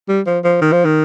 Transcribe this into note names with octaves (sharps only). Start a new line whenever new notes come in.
G3
F3
F3
D#3
F3
D#3